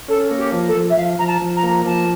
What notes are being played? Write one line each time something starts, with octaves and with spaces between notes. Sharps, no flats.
C#4 A4
A#3
G4
F3
A4
F3
E5
F3 F5
F3 A#5
A5
F3
A#5
A#3
F3 A5